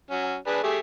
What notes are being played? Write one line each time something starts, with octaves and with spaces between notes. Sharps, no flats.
F#3 C#4 F#4
D4 G#4 B4
A3 G4 G#4